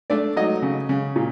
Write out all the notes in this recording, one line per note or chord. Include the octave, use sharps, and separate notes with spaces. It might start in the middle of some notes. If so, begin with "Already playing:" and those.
A3 D4 D5
F#3 D#4 D#5
C#3
C#3
A#2